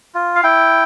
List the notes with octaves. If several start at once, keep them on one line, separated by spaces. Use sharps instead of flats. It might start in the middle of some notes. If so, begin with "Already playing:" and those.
F4
F5
E4 G5